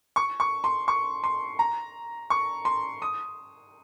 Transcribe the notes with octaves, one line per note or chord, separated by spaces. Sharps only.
C#6
C#6
C6
C#6
C6
A#5
C#6
C6
D#6